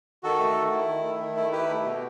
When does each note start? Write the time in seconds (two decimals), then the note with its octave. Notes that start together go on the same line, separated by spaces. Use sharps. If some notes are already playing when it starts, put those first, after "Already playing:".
0.23 D#3 F#4 A4
0.39 A3
0.55 D#3
0.72 E4
0.88 D#3
1.04 A3
1.20 D#3
1.37 E4
1.52 E4 G4 B4
1.69 A3
1.85 B2